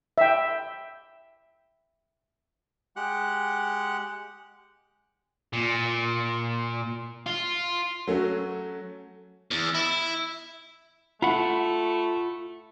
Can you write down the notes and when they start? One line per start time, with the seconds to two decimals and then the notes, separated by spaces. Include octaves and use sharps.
0.18 E5 G5
2.96 G#3 G4 F#5 F#6
5.53 A#2
7.26 F4
8.07 F#3 A3 C#4 F#4
9.51 E2
9.75 E4
11.22 A3 F4 F#5 B5